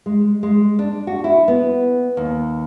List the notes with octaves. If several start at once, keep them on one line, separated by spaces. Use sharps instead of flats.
G#3
G#3
D4
F#4
E4
B3
D#2